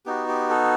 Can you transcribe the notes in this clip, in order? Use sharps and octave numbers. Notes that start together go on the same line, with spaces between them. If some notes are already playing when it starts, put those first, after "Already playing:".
B3 D#4 F#4 G4
G4
A4